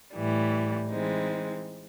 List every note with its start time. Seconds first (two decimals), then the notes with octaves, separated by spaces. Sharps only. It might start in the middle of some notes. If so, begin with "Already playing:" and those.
0.15 A2 E3 G3
0.90 E3 G#3 C4 D#4